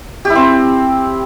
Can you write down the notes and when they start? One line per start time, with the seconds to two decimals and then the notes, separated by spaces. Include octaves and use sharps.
0.25 G4
0.30 E4
0.35 C4